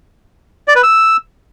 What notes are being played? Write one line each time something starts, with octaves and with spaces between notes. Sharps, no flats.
D5
B4
E6